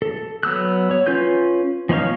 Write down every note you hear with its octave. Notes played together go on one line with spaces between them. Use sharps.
A4
F#3 B3 E6 F#6
C#5
C#4 F4 B4 G6
F3 B3 D#4 C#5 F5